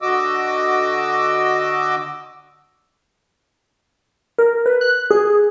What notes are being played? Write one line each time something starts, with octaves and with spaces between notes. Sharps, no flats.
D3 F#4 D#5 D6 E6
A#4
B4
F#6
G#4